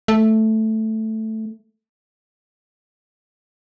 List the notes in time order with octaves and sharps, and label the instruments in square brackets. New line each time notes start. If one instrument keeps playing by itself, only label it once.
[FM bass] A3